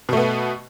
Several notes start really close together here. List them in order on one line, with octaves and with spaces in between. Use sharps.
B2 A3 B3